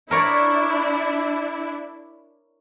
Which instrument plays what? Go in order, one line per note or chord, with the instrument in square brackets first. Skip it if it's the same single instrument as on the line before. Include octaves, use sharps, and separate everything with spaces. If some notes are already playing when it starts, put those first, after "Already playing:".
[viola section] D4 E4 [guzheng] A#4 C#5 D5